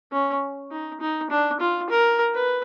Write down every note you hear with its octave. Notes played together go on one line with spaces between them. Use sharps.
C#4
D#4
D#4
D4
F4
A#4
B4